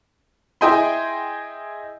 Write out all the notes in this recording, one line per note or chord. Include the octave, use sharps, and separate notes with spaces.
E4 G#4 D#5 G5 G#5 C6